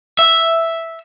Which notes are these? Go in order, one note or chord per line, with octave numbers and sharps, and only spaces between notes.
E5